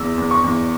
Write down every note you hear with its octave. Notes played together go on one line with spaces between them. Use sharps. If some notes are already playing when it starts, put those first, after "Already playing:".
Already playing: E2 E6
E2
C#6
E2